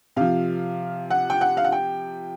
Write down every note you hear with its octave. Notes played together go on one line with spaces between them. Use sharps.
C3 F3 F5
F#5
G5
F#5
F5
F#5
G5